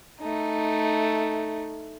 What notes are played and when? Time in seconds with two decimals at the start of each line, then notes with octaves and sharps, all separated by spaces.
0.20 A3 D#4